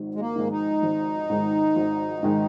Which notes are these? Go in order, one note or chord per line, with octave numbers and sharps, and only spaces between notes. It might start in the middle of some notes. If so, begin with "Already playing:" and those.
Already playing: G#1 G#2 D#3
G#3
A#3
G#2 D#3 G#3
D#4
G#1
G#2 D#3 G#3
G#1
G#2 D#3 G#3